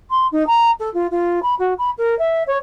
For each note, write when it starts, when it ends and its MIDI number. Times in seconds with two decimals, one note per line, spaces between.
0.10 0.26 84
0.31 0.46 63
0.47 0.71 82
0.79 0.92 69
0.93 1.07 65
1.10 1.42 65
1.42 1.54 83
1.59 1.73 66
1.78 1.90 83
1.97 2.17 70
2.18 2.43 76
2.47 2.58 73